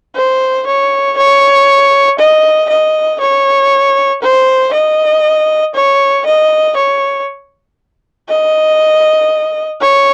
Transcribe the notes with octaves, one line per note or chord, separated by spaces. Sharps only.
C5
C#5
C#5
D#5
D#5
C#5
C5
D#5
C#5
D#5
C#5
D#5
C#5